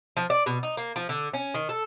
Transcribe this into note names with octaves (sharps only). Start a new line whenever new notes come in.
F3
D5
B2
D#4
A#3
F3
D3
C#4
D#3
A4